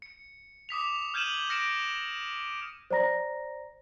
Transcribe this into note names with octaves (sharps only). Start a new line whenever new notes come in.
C#7
D6 D#6 B6 F7
F6 G6 G#6 D#7 E7 F#7
F6 A#6 C#7 D7 E7
C5 D5 A#5 A#6